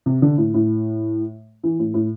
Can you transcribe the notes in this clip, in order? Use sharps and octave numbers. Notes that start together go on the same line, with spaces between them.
C3
D3
A2
A2
E3
A2
A2